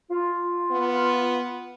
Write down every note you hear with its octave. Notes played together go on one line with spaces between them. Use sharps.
F4
B3